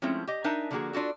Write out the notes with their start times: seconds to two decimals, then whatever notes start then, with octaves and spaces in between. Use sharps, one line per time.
0.02 F3 G#3 A3 C4 C#4 E4
0.27 G4 D#5
0.44 D4 D#4 A#4 E5 G#5 A5
0.71 D3 F3 G3 A#3 F#4 G#4
0.93 D4 F4 F#4 A4